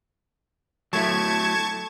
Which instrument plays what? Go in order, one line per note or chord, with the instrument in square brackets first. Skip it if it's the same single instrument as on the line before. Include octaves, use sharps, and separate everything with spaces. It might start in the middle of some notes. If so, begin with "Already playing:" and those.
[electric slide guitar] F#3 A3 E4 [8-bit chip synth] A5 C#6 G#6